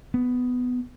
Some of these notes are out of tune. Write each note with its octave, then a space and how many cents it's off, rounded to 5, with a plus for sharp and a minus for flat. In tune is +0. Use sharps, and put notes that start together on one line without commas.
B3 +10